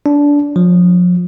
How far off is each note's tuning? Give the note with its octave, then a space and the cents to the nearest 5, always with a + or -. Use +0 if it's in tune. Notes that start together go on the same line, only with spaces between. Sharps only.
D4 -20
F3 +35